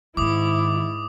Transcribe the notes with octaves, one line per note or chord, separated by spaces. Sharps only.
G#2 D#3 G#3 E4 D6 D#6